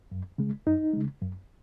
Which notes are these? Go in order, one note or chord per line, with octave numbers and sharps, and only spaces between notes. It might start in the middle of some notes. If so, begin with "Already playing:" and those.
F#2
C#3 G#3
F#2 D#4
C#3 G#3
F#2